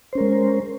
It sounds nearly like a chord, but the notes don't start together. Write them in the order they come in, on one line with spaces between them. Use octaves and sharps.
C5 C#4 A#4 G#3